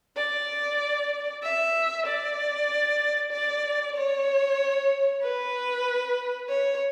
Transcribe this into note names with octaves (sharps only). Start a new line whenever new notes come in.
D5
E5
D5
D5
C#5
B4
C#5